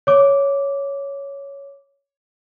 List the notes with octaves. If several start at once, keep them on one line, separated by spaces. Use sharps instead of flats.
C#5 D6